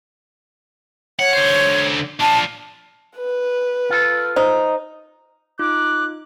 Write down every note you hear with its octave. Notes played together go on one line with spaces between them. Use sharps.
C#5 F#5
D3 C5
D4 F4 A5
B4
F4 A4
D#4 C5
D#4 F4 D6 F#6